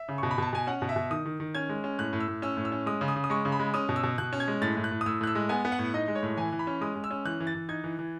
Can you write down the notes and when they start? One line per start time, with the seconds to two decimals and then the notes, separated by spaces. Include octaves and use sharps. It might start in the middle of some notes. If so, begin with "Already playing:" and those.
Already playing: E5
0.08 C#3
0.18 B2 C#6
0.31 B5
0.38 B2 A5
0.53 B2 G#5
0.67 C#4 F#5
0.82 B2
0.89 E5
0.96 B2
1.10 D#3 D#6
1.25 D#3
1.40 D#3
1.55 C#4 G#6
1.69 G#3
1.84 C#4
1.99 A2 F#6
2.13 A2
2.20 E6
2.28 A2
2.42 C#4 E6
2.57 A2
2.65 E6
2.72 C#4
2.86 G#3 D#6
3.01 C#3
3.08 D#6
3.16 C#3
3.24 D#6
3.30 G#3 C#6
3.45 C#3
3.52 B5
3.59 G#3
3.74 C#4 D#6
3.89 B2
3.96 E6
4.03 B2
4.18 B2 F#6
4.33 C#4
4.40 G#6
4.48 G#3
4.62 A2 A6
4.77 A2
4.84 F#6
4.91 A2
5.01 D#6
5.06 A2 E6
5.21 A2 F#6
5.27 E6
5.35 G#3
5.49 B3 G#5
5.65 B3
5.72 F#5
5.79 A2
5.94 D#4 D#5
6.08 G#3
6.15 C#5
6.23 A2
6.37 E3 G#5
6.52 E3
6.59 B5
6.67 C#4
6.81 G#3 D#6
6.95 G#3
7.04 E6
7.11 C#4
7.25 E3 F#6
7.40 E3
7.47 A6
7.55 E3
7.69 D#4 G#6
7.84 E3
7.99 E3